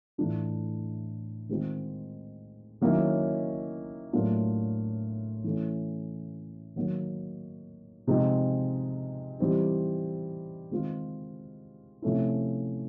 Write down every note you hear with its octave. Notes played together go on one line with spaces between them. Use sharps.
A2 E3 A3 D4 F4
D#3 G#3 C4 F4
D#3 F#3 A#3 C#4 E4
A2 F#3 A#3 D4 F4
E3 A3 C#4
D#3 F#3 A#3
C3 F3 G#3 C4 D#4
E3 G3 C4 D#4
D#3 G#3 C4 F4
C3 F3 A3 C#4 E4